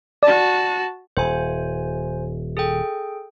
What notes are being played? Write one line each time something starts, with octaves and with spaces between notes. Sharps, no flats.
F#4 D5 A5
D#1 C5 G#5
G#4 A4 G5